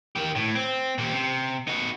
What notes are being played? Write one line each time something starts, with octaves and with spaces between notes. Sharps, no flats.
D#3 G4
A2
C4
A#2 G4
C3
D#4 F#4